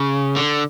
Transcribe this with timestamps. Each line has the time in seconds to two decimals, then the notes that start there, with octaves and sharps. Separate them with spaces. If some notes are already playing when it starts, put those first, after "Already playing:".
Already playing: C#3
0.36 D3